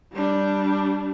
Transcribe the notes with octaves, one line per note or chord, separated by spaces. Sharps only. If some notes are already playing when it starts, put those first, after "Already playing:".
G3 D4